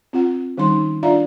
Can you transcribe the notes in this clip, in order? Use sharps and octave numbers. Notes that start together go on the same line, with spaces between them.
C4 F4 F#5
D#3 G3 C#4 D#4 C6
D4 F4 D5 E5 F5 A#5